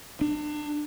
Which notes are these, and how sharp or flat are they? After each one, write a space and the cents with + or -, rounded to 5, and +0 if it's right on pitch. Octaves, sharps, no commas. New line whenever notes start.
D4 +30